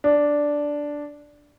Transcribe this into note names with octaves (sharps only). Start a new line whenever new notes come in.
D4